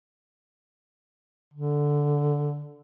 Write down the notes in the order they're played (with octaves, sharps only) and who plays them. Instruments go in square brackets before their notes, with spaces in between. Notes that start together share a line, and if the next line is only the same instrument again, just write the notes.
[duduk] D3